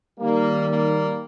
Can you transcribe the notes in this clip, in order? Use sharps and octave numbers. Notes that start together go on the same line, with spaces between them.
D#2 D#3 G3 A#3
A#3